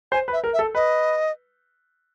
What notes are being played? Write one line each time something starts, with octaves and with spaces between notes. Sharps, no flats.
C5 G#5
B4
E5
A#4
E5
A4
B4 D#5